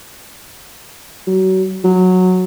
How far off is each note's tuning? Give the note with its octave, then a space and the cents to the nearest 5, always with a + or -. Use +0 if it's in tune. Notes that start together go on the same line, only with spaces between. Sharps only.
F#3 +25
F#3 -10